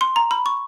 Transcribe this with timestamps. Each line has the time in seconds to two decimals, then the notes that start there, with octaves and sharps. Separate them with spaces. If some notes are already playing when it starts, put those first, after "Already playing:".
0.01 C6
0.16 A#5
0.31 B5
0.46 C#6